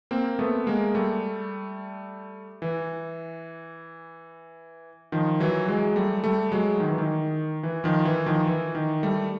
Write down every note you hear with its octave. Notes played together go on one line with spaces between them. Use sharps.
A#3 C4
A3 B3
G#3 A#3
G3 A3
E3
D#3 F3
E3 F#3
F#3 G#3
G3 A3
G3 A3
F#3 G#3
D#3
E3
D#3
E3
D#3 F3
E3
D#3 F3
E3
D#3
G3 A3